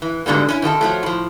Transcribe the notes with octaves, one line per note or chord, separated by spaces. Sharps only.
E3
G#2 B2 D3 G3 A#3
C#4 D#4 E4
F#2 D#3 F#4 A4
F3 F#3 A3
A2 F3